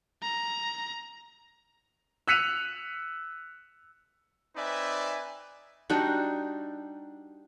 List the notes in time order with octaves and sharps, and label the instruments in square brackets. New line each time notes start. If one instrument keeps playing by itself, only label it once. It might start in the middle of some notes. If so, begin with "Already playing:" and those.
[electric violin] A#5
[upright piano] E6 F#6 B6 C#7 D#7 F7
[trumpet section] C4 D#4 B4 D5 E5 G#5
[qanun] G3 D4 D#4 F#4